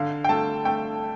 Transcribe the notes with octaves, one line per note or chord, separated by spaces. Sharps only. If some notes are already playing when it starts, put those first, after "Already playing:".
Already playing: D3 F5
G5
A3 A5
A3 G5